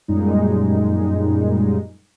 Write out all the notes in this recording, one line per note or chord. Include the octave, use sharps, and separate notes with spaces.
F#2 A#2 G3 G#3 D#4